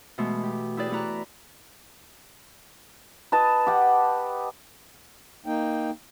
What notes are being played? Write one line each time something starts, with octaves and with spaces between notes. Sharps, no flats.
B2 E3 G#3 A3
G4
E4 G4 G#4 B4 D5
A3 E4 B4 A#5 F#6
B4 D#5 A5
G4 F#5
A#3 D#4 G5